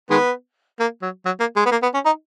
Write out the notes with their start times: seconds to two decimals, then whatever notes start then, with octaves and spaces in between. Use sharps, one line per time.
0.10 D#3 G#3 B3
0.80 A#3
1.02 F#3
1.26 F#3
1.40 A#3
1.56 G#3
1.66 B3
1.71 A#3
1.83 B3
1.94 C#4
2.05 D#4